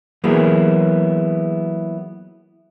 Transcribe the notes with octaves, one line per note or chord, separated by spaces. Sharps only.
E3 F#3 A#3 B3 E4 G#4